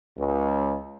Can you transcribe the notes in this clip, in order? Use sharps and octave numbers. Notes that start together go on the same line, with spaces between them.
C#2